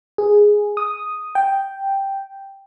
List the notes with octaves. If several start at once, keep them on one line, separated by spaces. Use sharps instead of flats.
G#4
D#6
G5